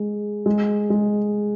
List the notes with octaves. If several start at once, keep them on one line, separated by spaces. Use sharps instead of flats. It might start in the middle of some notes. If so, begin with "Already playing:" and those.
Already playing: G#3
G#3
G#3